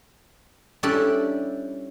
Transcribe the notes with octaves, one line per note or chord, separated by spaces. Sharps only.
G3 C#4 D4 E4 G4 A4